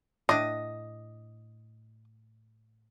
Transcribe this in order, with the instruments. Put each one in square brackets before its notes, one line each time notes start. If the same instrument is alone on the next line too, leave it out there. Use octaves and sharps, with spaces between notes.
[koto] A2 D4 [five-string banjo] D#5